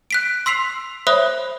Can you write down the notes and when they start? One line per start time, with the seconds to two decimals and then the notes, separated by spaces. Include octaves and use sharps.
0.11 F#6 B6 D7
0.46 C6 E6 B6 C7 F7
1.07 C5 C#5 E5 B5 D#6 F#6